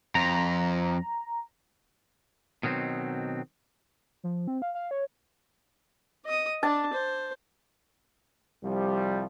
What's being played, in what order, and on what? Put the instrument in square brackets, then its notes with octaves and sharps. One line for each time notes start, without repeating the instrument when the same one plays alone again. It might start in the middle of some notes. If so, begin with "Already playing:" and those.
[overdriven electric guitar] F2 [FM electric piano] A#5
[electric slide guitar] B2 D#3 F#3 A#3 C4
[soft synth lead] F3
C4
F5
F5
C#5
[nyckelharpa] D#5 D#6
[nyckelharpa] D4 [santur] A5
[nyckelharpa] C5
[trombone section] C2 F3 G3